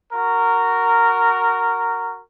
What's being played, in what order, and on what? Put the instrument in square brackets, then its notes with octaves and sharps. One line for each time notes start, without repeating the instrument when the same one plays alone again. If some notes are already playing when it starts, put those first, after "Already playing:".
[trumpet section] F#4 A#4